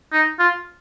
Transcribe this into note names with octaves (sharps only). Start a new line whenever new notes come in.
D#4
F4